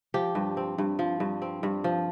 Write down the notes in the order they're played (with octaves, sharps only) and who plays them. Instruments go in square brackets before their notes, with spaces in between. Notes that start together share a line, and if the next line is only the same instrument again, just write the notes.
[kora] F3 G4
G2
C4
G2
F3
G2
C4
G2
F3